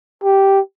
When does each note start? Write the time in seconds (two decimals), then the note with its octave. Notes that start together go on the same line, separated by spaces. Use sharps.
0.24 G4